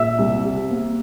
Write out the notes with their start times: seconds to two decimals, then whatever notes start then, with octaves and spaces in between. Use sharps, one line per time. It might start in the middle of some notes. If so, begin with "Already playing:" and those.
Already playing: A#2 E5 E6
0.18 C2
0.45 C3
0.71 A#3